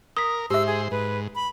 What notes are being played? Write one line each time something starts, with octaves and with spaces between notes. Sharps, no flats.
A#4 D#6 B6
G#2 G4 C5 E5 E6
G#4
G#2 B4
B5